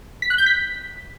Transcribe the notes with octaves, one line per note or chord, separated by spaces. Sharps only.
B6
F#6
G6
B6